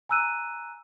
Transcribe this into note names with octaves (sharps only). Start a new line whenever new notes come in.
G#5 A#5 E6 F#6 D#7